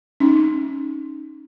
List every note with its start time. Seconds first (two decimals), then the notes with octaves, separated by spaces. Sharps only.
0.20 C#4 D#4